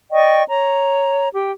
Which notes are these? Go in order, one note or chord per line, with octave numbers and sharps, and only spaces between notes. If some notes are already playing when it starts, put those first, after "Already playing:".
D5 D#5 G5 C#6
C#5 A#5
G4 G5